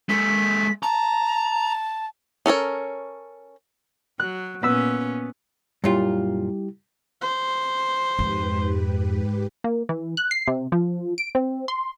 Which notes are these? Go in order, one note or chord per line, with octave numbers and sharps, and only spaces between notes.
G#3 A4 B6
A5 A#5
C#4 A4 A#4 C#5
F#3 F#6
A#2 B3 C#4 E6 B6
F#2 A#2 G3 E4 F4 G4
C5
F2 G#2 G4 B4
A#3
E3
F#6
C7
C3
F3
D7
C4
C6